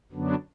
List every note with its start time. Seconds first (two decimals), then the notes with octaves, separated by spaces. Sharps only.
0.12 F#2 D3 F#3 B3 D4